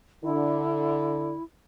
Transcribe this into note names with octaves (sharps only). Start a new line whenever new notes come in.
D3 E4